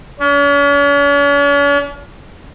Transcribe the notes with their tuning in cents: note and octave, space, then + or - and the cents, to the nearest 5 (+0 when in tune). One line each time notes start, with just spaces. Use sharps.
C#4 +45